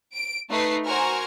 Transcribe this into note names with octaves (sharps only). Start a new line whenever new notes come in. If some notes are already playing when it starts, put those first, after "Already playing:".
D7
A3 D#4 B4 C7
F#4 A#4 C5 G#5 C#6 F6